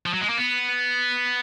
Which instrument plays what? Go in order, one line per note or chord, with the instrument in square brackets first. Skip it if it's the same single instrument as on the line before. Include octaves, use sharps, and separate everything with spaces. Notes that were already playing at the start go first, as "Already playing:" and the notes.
[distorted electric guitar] F3
F#3
G#3
A#3
B3